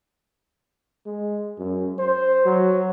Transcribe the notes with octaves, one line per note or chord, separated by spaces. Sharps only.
G#3
F#2
C5
F#3